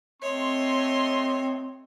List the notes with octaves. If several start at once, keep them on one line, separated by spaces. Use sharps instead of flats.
A3 C4 C#5 D#5 C6